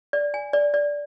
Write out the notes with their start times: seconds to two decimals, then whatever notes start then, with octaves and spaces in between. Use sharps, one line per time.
0.13 D5
0.34 G#5
0.53 D5
0.74 D5